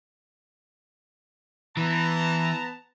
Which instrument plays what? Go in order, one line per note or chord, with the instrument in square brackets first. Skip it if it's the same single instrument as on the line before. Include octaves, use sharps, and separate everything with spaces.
[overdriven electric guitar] E3 [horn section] B3 A5 A#5